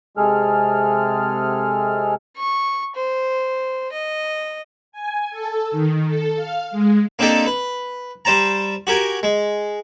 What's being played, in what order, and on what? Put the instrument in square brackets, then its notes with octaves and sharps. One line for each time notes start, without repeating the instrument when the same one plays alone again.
[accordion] C3 G#3 G#4 A4 F6
[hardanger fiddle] C#6
C5
D#5
[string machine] G#5
A4
D#3
A4
F5
G#3
[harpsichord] A#3 C4 D4 D#4 G4 A4
B4
G3 C5 A5 A#5
F#4 G4 A#4 G#5
G#3